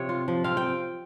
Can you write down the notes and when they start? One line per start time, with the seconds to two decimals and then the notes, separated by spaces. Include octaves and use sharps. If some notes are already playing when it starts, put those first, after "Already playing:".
Already playing: C3 F3 C4 C#5
0.09 F4
0.28 F3
0.44 C4 F5
0.57 G5